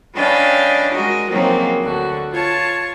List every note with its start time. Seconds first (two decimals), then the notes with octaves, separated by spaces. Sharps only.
0.15 C#4 D4 B4 D#5 F5 G5
0.92 G#3 F#4 A#4 D#5
1.31 C#3 F3 F#3 A#3 C4 D#4
1.81 D2 D3 F#4
2.32 F4 C#5 A5